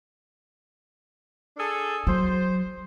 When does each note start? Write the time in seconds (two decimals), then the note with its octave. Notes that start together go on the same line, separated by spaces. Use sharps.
1.57 D4 G#4 A4
2.07 F#3 C5